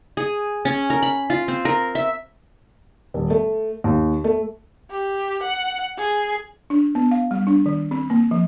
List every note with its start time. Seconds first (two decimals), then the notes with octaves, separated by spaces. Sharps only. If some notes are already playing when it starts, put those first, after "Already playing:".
0.17 G#4
0.65 C#4
0.90 A#4
1.03 B5
1.30 F4
1.48 C4
1.65 A#4
1.95 E5
3.14 D#1
3.30 A3
3.84 D#2
4.24 A3
4.91 G4
5.43 F#5
5.98 G#4
6.70 D4
6.95 B3
7.11 F5
7.31 G3
7.47 D4
7.66 D#3
7.91 C4
8.10 A#3
8.31 F3